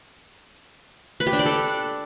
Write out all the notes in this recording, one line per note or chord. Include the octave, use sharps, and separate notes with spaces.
B4
G4
D4
D5
A4